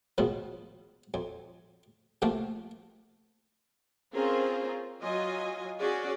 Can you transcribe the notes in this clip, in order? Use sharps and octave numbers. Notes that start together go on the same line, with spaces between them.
G#2 B2 D#3 F3
F2
C3 F3 A3 A#3
C4 C#4 F4 G#4 A#4 C5
F#3 F4 D#5 G#5
C#4 F#4 G#4 D5